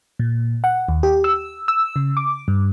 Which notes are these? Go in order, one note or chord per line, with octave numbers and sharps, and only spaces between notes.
A#2
F#5
D#2
G4
E6
E6
C#3
D6
G2